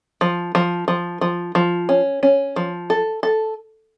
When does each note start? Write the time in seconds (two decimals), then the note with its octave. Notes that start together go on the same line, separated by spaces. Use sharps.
0.21 F3
0.55 F3
0.88 F3
1.21 F3
1.55 F3
1.89 C#4
2.23 C#4
2.56 F3
2.90 A4
3.23 A4